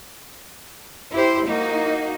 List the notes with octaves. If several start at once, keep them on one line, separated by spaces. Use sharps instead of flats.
E4 G4 C5
A#3 D#4 F#4